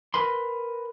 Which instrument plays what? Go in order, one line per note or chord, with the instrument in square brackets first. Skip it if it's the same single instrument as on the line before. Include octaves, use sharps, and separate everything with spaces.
[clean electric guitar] A#4 B4 B5 C6